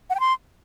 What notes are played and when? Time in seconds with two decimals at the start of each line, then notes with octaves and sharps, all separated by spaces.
0.10 F#5
0.15 G5
0.20 C6